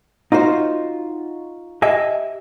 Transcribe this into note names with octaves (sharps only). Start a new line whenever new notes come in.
D#4 F4 F#4 C5
G4 D#5 E5 G#5